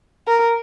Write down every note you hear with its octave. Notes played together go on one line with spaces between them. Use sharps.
A#4